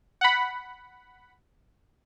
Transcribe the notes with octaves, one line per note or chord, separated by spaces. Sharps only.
F#5 B5